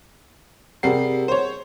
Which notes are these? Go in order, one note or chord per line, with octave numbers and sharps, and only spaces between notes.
C3 G3 G#4 A#4 F#5 C7
C5 C#5